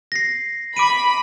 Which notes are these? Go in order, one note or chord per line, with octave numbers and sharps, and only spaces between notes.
A#6 C7
B5 D6 D7 D#7